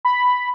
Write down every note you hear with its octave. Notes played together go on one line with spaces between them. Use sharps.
B5